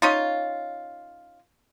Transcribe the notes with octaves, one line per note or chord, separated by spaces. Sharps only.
C#4 D#4 F4